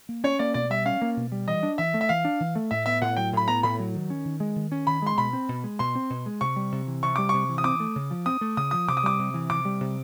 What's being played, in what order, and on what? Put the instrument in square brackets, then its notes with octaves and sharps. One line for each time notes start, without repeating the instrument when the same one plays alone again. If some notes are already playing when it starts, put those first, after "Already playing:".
[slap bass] A#3
[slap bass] C#4 [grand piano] C#5
[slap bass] A#3 [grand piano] D5
[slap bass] B2 [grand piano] D5
[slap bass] G3 [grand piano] E5
[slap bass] C#4 [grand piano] F5
[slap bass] A#3
B2
G3
[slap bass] E3 [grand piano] D#5
[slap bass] D4
[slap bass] E3 [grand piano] E5
[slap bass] A3
[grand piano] E5
[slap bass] E3 [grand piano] F5
[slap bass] D4
E3
A3
[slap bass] A2 [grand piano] E5
[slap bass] B3 [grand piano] E5
[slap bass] A2 [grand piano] F#5
[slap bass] F#3 [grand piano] G5
[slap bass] A2 [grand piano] B5
[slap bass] B3 [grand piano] A#5
[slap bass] A2 [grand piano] B5
[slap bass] F#3
D#3
C#4
D#3
G#3
D#3
C#4
[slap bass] D#3 [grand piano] B5
[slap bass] G#3 [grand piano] C6
[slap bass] B2 [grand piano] B5
[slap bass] C4
B2
G#3
[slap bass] B2 [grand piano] C6
[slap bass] C4
B2
G#3
[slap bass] C3 [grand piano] C#6
[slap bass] G3
C3
E3
[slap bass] C3 [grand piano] C#6
[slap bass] G3 [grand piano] D6
[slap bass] C3 [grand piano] C#6
[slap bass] E3
[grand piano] D#6
[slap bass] C4 [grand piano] D6
[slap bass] A3
C#3
F3
[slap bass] C4 [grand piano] D#6
[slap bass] A3
[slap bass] C#3 [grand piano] D#6
[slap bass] F3 [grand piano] D#6
[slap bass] C3 [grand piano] D6
[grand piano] D#6
[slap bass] G3 [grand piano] D6
[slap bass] C3
E3
[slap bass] C3 [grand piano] D6
[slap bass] G3
C3